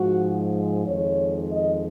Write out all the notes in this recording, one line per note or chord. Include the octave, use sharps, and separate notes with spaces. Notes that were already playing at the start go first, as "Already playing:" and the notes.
Already playing: G#2 F3 G#3 F#4
F2 D#3 G#3 C#5
D#5